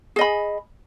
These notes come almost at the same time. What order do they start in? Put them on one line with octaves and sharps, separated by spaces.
G#4 D#5 B5